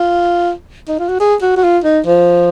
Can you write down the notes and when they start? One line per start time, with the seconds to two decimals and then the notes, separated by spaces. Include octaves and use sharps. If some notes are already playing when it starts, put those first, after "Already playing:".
Already playing: F4
0.88 D#4
0.99 F4
1.09 F#4
1.20 G#4
1.42 F#4
1.57 F#4
1.63 F4
1.84 D#4
2.06 F3